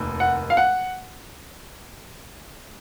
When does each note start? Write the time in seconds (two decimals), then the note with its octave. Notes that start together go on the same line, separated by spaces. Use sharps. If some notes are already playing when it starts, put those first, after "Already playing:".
Already playing: F1 D#2
0.20 F#5
0.50 F5
0.57 F#5